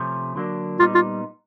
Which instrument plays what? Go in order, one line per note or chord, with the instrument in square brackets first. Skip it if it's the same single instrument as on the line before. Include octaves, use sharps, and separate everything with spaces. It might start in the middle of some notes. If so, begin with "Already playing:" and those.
Already playing: [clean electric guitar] C3 F3 A3 C#4
D3 F#3 A#3 D4
[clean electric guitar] A#2 G3 B3 D#4 [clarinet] F4
[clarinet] F4